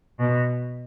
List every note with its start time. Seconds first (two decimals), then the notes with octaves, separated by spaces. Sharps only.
0.19 B2